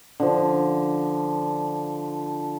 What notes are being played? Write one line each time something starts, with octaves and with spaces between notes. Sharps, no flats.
D3 F3